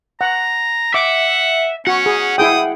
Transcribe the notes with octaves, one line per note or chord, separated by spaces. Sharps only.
F#5 A#5
E5 F#5 D6
C#4 F#4 F#5
G#4
E4 G#4 G5 D#6